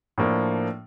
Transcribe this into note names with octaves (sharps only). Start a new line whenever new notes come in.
A2 F3 A#3 D4